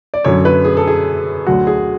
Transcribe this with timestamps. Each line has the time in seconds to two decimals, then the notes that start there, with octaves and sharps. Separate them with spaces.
0.14 D5
0.24 F#2 D3 F#3 C#5
0.45 B4
0.65 G#4
0.77 A4
0.87 G#4
1.47 D2 D3 F#3 F#4
1.67 G#4